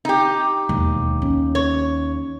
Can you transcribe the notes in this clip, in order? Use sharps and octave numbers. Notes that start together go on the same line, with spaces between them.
D#4 G4
E1 D#2
C#4
C#5